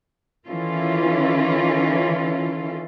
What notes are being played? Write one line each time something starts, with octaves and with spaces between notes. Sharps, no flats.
D#3 E3 C#4 F4 A4